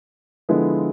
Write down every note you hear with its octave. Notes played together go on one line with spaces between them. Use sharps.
D3 F3 G#3 B3 E4